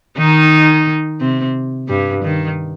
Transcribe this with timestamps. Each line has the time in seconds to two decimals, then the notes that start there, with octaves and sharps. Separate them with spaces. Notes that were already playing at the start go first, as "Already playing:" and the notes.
0.18 D#3 D#4
1.21 C3 C4
1.89 G2 G3
2.23 D#3